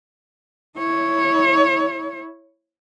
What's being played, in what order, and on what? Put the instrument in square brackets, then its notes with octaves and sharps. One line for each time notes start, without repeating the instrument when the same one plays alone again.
[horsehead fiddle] E4 C#5